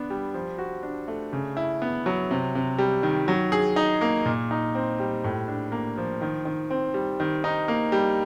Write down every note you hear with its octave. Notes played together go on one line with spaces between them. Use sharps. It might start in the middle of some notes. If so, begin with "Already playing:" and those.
Already playing: B3 D4
G3
F3
F#4
D4
A3
C#3
E4
B3
F#3
C3
C3
G3
D#3
F#3
G#4
D#4
A#3
A#2
D#4
C4
G3
A2
D4
A#3
F3
D#3
D#3
C4
G3
D#3
D#4
A#3
G3